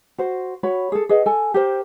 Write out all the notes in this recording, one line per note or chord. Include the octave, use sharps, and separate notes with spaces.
F#4 C5
F#4 C#5 B5
G#4 A4
G#4 B4 D#5 F#5
A4 G#5
G4 A#4 C5